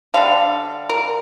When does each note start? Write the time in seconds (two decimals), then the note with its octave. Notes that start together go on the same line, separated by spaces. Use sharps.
0.14 D3 G3 D4 F5
0.89 A#4